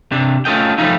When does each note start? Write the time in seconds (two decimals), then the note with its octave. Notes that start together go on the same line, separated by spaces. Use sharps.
0.12 C3 D4
0.45 A3 C#4 F4 A4 D#5 G5
0.78 F3 G3 A3 C#4 D#4 F4